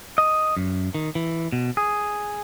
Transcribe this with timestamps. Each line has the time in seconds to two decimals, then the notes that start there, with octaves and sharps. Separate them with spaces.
0.18 D#5
0.57 F#2
0.95 D#3
1.15 E3
1.52 B2
1.77 G#4